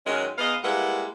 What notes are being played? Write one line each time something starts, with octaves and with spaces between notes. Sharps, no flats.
F#2 D#3 G#3 C#4
G#2 B3 D#5 F5
G3 G#3 A#3 E4 B4 F#5